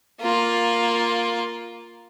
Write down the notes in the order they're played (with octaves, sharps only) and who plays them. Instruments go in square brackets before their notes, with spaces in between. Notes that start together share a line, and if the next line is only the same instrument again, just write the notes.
[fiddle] A#3 F4